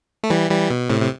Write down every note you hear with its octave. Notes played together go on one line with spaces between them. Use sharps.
A3
E3 G3
E3 G3
B2
A2 C3
C3